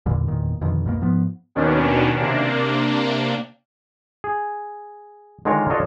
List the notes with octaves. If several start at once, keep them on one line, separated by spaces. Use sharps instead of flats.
E2 A#2 D3 G3
G1 E2 A#2 D#3
F2 B2 D3 D#3
C#2 F#2 B2 A#3
G#2 F3 B3
D#2 B2 D#3 C#4 D4
C3 A#3 D4
G#4
D3 D#3 G#3 F4 A#4 C#5
D4 F4 F#4 A4 C#5 D#5